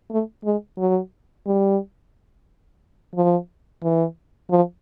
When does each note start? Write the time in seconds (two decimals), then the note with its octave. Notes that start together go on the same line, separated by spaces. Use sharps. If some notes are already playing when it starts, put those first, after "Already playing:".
0.10 A3
0.44 G#3
0.78 F#3
1.46 G3
3.15 F3
3.83 E3
4.51 F3